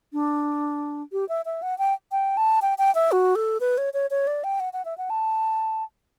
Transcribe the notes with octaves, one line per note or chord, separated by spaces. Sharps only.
D4
G4
E5
E5
F#5
G5
G5
A5
G5
G5
E5
F#4
A4
B4
C#5
C#5
C#5
D5
G5
F#5
F#5
E5
F#5
A5